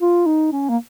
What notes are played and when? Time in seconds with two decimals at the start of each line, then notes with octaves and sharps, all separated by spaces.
0.01 F4
0.26 D#4
0.52 C#4
0.69 A#3